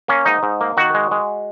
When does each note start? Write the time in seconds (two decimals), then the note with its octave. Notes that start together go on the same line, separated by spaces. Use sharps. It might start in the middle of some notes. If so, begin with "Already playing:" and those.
0.08 A#3 C#4
0.25 G#2 D#4
0.43 G#2
0.61 A#3
0.77 D#3 F#4
0.94 G#3
1.11 G#3